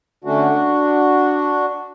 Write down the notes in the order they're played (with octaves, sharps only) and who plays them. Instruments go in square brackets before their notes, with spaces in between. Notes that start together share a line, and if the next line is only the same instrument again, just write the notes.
[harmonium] D3 A3 C#4 D4 F#4